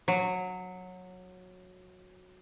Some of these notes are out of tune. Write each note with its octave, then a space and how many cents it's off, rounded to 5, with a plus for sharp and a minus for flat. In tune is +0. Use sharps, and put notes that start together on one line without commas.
F#3 -15